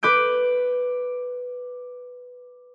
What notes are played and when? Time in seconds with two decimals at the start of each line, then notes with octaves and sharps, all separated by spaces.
0.03 B4 D6 G6 D7